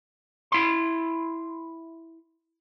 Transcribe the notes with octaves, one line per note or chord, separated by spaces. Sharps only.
E4 C6